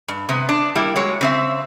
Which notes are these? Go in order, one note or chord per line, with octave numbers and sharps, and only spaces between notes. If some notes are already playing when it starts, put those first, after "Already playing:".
G2
C3 B3
D4
G3 A#3 E4
F#3 G#3 C#5
C#3 C4 E5